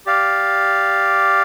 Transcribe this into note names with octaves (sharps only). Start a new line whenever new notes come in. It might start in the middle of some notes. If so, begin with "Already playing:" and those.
G4 D5 F5